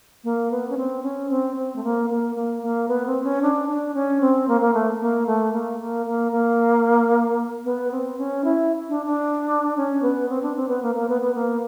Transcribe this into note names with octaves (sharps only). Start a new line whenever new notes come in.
A#3
B3
C#4
C4
C#4
C4
C4
A3
A#3
A#3
A#3
A#3
B3
C4
C#4
D4
D4
C#4
C4
A#3
A#3
A3
A#3
A3
A#3
A#3
A#3
A#3
B3
C4
C#4
E4
D4
D4
C#4
B3
C4
D4
C4
B3
A#3
A#3
B3
B3
A#3